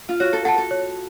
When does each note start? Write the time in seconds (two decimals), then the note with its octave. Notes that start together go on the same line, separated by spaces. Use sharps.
0.09 F4
0.20 F#4 C#5
0.33 A4
0.45 A4 F#5 A5
0.58 A4
0.71 C#5